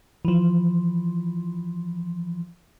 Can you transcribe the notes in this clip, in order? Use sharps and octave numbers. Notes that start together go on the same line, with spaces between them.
E3 F3